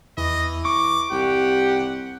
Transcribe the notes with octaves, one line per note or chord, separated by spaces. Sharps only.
E2 E3 D#5
C#6 D6
C2 G4 F#5